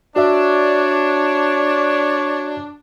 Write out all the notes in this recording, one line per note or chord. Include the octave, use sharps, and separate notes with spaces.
D4 F#4 C#5 D5 E5